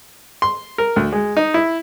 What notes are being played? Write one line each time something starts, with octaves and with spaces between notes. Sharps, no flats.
C6
A#4
D2
G#3
D#4
E4